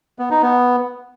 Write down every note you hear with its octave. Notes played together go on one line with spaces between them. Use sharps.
B3
D#4
B3